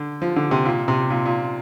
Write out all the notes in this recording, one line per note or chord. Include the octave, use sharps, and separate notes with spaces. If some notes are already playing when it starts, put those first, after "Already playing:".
Already playing: D3
F3
D3
C3
A#2
C3
A#2
A#2